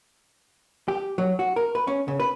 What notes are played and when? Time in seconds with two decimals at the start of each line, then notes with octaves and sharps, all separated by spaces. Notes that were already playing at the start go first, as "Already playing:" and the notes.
0.88 G4
1.18 F#3
1.39 F#4
1.56 A#4
1.75 B4
1.87 C#4
2.08 C#3
2.20 B4